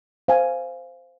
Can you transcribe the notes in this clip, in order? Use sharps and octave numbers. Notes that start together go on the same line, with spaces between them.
C5 F5 G#5